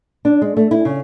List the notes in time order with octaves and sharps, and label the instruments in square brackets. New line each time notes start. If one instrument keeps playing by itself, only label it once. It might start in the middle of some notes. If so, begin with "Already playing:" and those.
[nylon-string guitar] D4
G#3
A3
E4
C#3